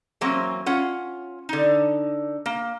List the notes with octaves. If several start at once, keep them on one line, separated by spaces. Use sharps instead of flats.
E3 F#3 A#3 C4 C#4
C#4 F4 F#5
D3 D#4
A#3